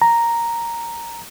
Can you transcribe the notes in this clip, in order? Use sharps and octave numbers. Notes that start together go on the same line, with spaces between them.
A#5